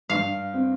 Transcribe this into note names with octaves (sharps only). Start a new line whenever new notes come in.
G2 F5
C4